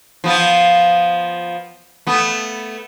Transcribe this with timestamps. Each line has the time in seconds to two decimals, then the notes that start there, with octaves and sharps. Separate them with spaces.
0.24 F3 B3 F4
2.07 A3 B3